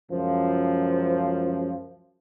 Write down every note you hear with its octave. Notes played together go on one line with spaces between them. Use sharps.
C#2 F#2 F3